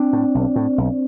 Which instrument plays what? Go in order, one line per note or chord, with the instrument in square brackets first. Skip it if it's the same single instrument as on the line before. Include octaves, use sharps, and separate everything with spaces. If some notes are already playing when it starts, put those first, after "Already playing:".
Already playing: [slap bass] C4 D4
A2
B1
A2
B1